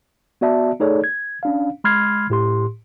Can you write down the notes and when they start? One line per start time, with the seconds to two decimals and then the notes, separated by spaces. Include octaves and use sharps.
0.41 B3 F#4 D5 E5 A5
0.80 A3 D#4 G#4 A4 C#5 D5
1.04 G#6
1.43 C#4 D4 F5
1.84 G#3 B5 C6 F6 G#6 C7
2.30 A2 G4 C6